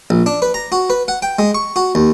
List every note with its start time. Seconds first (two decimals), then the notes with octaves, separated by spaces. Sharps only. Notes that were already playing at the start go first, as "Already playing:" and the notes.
0.10 A#1
0.26 D4
0.42 B4
0.54 A#5
0.72 F#4
0.90 B4
1.08 F#5
1.22 G5
1.39 G#3
1.55 C#6
1.76 F#4
1.95 D#2